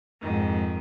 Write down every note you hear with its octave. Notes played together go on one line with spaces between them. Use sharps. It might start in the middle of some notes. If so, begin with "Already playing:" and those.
F2 G#2 D#3